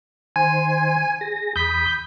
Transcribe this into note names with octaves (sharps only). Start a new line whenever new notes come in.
D#3 C5 G#5
G#4 A#6
E2 B5 D#6 G6 B6